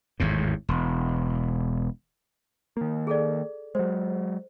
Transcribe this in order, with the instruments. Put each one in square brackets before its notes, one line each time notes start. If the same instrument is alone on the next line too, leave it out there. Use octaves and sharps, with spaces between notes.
[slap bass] G#1 E2 A2
E1
[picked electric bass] D#3 A#3
[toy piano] G#4 A4 D5
[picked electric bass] F#3 G#3 [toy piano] C5